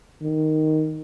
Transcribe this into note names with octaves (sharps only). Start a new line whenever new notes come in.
D#3